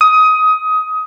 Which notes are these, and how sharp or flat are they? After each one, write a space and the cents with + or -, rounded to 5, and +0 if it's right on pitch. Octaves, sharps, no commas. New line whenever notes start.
D#6 +20